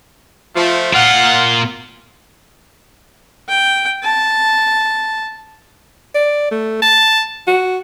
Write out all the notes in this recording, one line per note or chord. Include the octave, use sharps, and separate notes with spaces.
F3 A3
A#2 F4 F5 F#5
G5
A5
D5
A3
A5
F#4